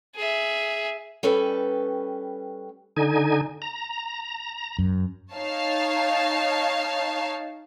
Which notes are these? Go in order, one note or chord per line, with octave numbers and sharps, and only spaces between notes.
G#4 E5
G3 C#4 A4 B4 G5
D3 D#4 G#5
A#5
F#2
D#4 C#5 F5 A5